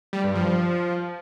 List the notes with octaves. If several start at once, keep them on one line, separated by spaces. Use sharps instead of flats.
G3
G2
F3